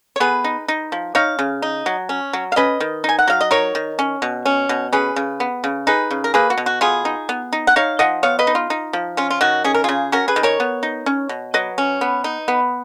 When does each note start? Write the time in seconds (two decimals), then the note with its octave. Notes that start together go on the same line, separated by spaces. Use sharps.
0.16 C#5
0.20 B3 G#4 B4
0.44 D#4
0.68 D#4
0.92 F3
1.15 D#4 C#5 F5
1.39 C#3
1.62 D#4
1.86 F#3
2.09 C#4
2.33 F#3
2.52 F5
2.56 C#4 B4 D#5
2.80 D#3
3.04 D#4 G#5
3.19 F#5
3.28 F#3 F5
3.41 D#5
3.51 D#4 A#4 C#5
3.75 D#3
3.99 C#4
4.22 B2
4.45 C#4
4.69 B2
4.93 C#4 G#4 B4
5.16 C#3
5.40 B3
5.64 C#3
5.87 D#4 G#4 B4
6.11 C#3
6.24 A#4
6.34 A#3 G#4 B4
6.50 F#4
6.58 B2
6.66 F#4
6.81 B3 F4 G#4
7.05 D#4
7.29 B3
7.53 D#4
7.67 F#5
7.76 D#4 C#5 F5
7.99 F3 D#5 F#5
8.23 B3 C#5 F5
8.39 B4 D#5
8.47 D#4
8.55 F4
8.70 D#4
8.93 F3
9.17 C#4 F4
9.30 F4
9.41 D#3 F#4
9.64 C#4 G#4
9.74 A#4
9.84 C#3 F4 G#4
10.12 C#4 F#4 A#4
10.28 G#4 B4
10.36 D#3
10.43 A#4 C#5
10.60 B3
10.83 D#4
11.06 C#4
11.29 B2
11.54 F#3 B4 D#5
11.78 C#4
12.01 B3
12.24 D#4
12.48 B3